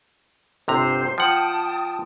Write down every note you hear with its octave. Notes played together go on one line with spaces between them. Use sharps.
G1 C3 C5 A#5
F3 F#5 G5 A5 D#6